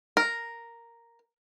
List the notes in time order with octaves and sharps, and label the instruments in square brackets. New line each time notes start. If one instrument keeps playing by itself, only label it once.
[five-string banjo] A#4